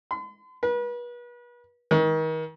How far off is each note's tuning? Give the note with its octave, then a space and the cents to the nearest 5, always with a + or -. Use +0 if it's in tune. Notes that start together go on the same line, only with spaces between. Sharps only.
C6 -45
B4 -35
D#3 +35